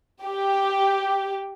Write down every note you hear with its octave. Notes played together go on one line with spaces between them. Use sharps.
G4